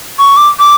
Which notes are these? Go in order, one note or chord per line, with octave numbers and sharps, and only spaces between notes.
C#6
D6
D6